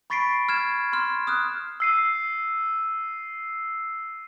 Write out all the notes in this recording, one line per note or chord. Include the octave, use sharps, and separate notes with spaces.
B5 C#6 A6 B6 C7 D7
F6 G#6 E7
C6 F6
D#6 F6 F#6
E6 C7 D#7